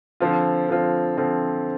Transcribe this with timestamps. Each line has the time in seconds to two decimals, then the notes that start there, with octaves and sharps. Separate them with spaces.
0.20 D3 F3 C4 F4
0.69 D3 F3 C4 F4
1.17 D3 F3 C4 F4